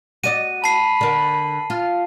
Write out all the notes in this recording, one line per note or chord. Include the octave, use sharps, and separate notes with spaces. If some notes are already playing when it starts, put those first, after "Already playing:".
F#4 D5 D#5 D#7
A5 B5 C7
D3 A#4
F4